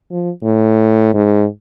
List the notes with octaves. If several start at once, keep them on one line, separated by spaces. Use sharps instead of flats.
F3
A2
G#2